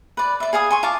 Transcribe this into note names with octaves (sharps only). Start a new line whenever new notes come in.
B4 D5
D5 E5
G#4 F5 G#5 D#6
G#5 C6 C#6
F4 A5 C#6 D6